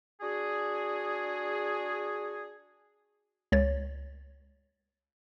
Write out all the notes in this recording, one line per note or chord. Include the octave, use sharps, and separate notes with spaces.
D4 F#4 G#4
C#2 C#5 A6